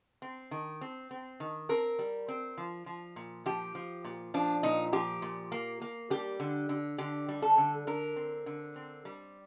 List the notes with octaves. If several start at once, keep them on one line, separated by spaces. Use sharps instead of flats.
C4
D#3
C4
C4
D#3
C4 A#4
G3
C4
F3
F3
A#2
F3 G4
F3
A#2
F3 D4
A#2 D#4
F3 G4
A#2
A#3
A#3
G3 G4
D3
D3
D3 G4
G3
A4
D3
D3 A#4
C4
D3
C4
G3